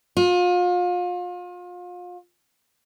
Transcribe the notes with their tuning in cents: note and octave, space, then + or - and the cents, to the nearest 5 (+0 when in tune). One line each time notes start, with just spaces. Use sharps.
F4 +35